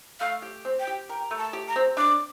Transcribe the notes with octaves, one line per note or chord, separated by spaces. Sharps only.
A3 F5
G4
C4
G5
G4
A#4 G5
A3
A5
G4
A#5
C4
D4 D6